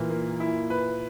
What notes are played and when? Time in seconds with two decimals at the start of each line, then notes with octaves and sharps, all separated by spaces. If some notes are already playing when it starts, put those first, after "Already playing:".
Already playing: A#2 E3
0.10 A#3
0.40 E4
0.70 B4